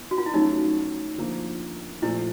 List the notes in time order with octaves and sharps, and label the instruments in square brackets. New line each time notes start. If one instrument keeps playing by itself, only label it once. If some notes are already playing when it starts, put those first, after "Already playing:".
Already playing: [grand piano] B3 E4
[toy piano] F#4
F4
E4
[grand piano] F#3 A3 C#4 F#4 [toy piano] D#4
[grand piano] D3 F3 A#3
[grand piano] A#2 F3 A3 [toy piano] E4